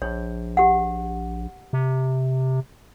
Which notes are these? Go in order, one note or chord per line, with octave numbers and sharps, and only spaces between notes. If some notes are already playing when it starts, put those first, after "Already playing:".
A#1 C#5
G4 F#5
C3